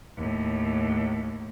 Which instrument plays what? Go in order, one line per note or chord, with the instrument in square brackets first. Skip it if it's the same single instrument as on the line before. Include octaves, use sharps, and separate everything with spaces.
[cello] D#2 A2